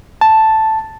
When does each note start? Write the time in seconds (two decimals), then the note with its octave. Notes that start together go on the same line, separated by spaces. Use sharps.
0.21 A5